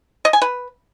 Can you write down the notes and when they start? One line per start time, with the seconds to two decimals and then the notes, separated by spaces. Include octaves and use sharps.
0.25 D#5
0.33 G#5
0.42 B4